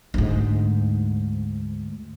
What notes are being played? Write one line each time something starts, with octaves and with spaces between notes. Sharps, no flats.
D2 G#2